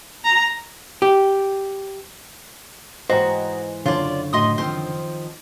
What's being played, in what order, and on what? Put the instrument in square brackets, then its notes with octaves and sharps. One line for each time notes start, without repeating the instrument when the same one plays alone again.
[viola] A#5
[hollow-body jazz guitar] G4
[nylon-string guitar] G#2 E3 [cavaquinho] F#4 [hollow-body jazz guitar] C5 [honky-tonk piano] D#5 G5 A#5
[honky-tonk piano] F#1 C#5 [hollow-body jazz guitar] D3 [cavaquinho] F4 D5
[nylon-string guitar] A2 F#4 [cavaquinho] D#5 C6 D#6
[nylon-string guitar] D#3 F3 C4 [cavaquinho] C5